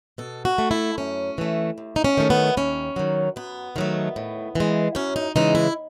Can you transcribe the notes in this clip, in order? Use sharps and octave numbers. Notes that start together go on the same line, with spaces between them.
B2 A4
F#4
A3
E4
F#2 C#4
E3 A3
D#2
D#4
C#4
D#3 F#3 A3
B3
D#2 C#4
D#3 F#3
F#2 B3
D#3 F#3 A3
A2
E3 G#3
F#2 C#4
D#4
C#3 E3 G#3 D#4
E4